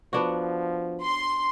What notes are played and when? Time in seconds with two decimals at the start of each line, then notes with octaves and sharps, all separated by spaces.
0.13 F3 B3 D4 F#4
1.03 C6